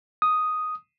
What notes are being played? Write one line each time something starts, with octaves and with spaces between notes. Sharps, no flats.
D#6